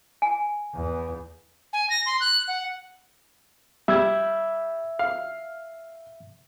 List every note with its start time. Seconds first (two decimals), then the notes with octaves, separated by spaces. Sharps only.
0.22 G#5
0.74 E2
1.73 G#5
1.90 A#6
2.06 C6
2.20 F#6
2.48 F#5
3.88 G3 E5 E6 G#6
4.99 F5